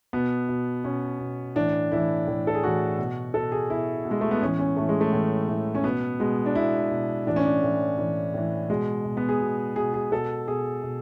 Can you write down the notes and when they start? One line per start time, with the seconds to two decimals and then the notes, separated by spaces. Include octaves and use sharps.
0.13 B2 B3
0.49 B2
0.84 B2 C#4
1.20 B2
1.56 A2 E3 D4
1.92 A2 E3 E4
2.27 A2 E3
2.47 A4
2.55 G#4
2.63 A2 E3 F#4
2.99 B2
3.34 B2 A4
3.52 G#4
3.70 B2 E4
4.05 B2
4.11 G#3
4.21 A3
4.31 B3
4.41 A2 E3 C#4
4.59 C#4
4.77 A2 E3 A3
4.89 G#3
5.01 A3
5.13 A2 E3
5.49 A2 E3
5.75 C#4
5.84 B2 B3
6.20 B2 G#3
6.46 D4
6.55 B2 E4
6.91 B2
7.27 A2 E3 D4
7.36 C#4
7.45 D4
7.63 A2 E3
7.98 A2 E3
8.34 A2 E3
8.69 B2 G#3
9.05 B2
9.17 B3
9.29 G#4
9.41 B2
9.76 B2 G#4
9.94 G#4
10.12 B2 A4
10.48 B2 G#4
10.83 B2